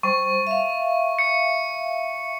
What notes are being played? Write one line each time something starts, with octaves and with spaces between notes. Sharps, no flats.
G3 C5 C#6
E5 F5
C#7